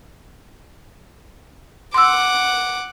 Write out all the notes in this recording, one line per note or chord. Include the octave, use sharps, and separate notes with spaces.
F#5 C6 D6 E6